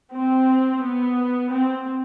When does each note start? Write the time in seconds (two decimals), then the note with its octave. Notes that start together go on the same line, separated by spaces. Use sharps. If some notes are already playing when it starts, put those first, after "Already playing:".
0.12 C4
0.82 B3
1.52 C4